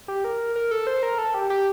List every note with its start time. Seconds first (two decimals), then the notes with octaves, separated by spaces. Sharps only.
0.08 G4
0.24 A#4
0.56 A#4
0.71 A4
0.87 C5
1.03 A#4
1.18 A4
1.34 G4
1.50 G4